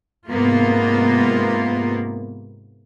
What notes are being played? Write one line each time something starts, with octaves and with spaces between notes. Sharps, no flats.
G#2 C3 A#3 B3 F4